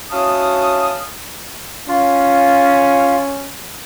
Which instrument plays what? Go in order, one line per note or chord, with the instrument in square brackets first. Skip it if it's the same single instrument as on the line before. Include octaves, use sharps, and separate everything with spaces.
[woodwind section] C#4 E4 F#4 F5 A5 D#6
[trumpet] C#4 [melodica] F4